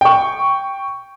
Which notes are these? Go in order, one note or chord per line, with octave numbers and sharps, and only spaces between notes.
G5 C#6